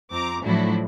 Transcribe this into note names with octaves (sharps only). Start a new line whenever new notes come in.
F2 C4 A#5 D6
A2 F3 F#3 A3 D4 E4